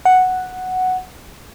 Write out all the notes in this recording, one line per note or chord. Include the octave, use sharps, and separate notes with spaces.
F#5